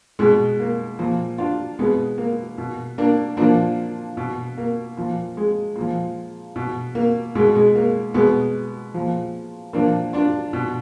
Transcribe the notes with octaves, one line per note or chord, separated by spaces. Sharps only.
B2 G#3
A#3
A#2 F3
D4 F4
B2 G#3 B3
A#3
B2
A#3 D4
A#2 F3 A#3 D4
B2
A#3
A#2 F3
G#3
A#2
F3
B2
A#3
B2 G#3
G#3
A#3
B2 G#3 B3
A#2 F3
A#2 F3 A#3 D4
D4 F4
B2